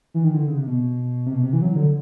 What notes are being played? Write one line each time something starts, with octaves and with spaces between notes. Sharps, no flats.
E3
D#3
D3
C#3
C3
B2
C3
B2
C3
E3
F#3
D3